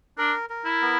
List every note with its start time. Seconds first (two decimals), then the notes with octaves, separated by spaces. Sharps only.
0.18 D4 A#4
0.50 A#4
0.65 E4
0.81 B3